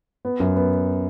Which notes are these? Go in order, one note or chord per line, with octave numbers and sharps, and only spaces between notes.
B3
F#2
B3